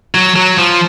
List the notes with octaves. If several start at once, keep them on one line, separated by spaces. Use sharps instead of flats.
F#3
F#3
F3